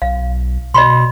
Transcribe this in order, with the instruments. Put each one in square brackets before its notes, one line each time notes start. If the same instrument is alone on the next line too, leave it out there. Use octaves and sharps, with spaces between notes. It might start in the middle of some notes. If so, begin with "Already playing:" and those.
[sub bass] B1 [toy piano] F5
[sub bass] B2 [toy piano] D#5 B5 C6